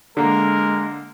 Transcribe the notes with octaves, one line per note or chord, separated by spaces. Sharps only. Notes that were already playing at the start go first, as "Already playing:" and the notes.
D3 G#3 A#3 A#4